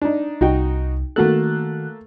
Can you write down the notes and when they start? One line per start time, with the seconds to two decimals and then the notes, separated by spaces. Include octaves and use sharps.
0.02 D4 D#4
0.41 C2 D#4 F#4 G5
1.16 D#3 A3 A#3 F#4 A4 F#6